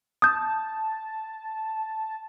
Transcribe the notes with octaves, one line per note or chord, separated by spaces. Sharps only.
A5 D#6 G6